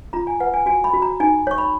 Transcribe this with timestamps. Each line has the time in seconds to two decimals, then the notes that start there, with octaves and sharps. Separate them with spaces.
0.13 F4 A#5
0.27 G#5
0.40 B4 F#5
0.54 G#5
0.66 F#4 G#5
0.84 B5
0.94 F#4
1.02 A#5
1.20 D#4 G#5
1.47 C#5 C#6
1.58 B5